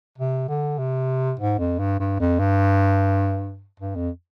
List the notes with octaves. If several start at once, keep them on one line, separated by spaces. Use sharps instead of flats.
C3
D3
C3
G#2
F2
G2
G2
F2
G2
G2
F2